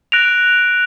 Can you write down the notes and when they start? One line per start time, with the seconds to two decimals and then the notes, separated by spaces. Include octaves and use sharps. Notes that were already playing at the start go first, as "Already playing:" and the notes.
0.12 F#6 A#6 D7 F7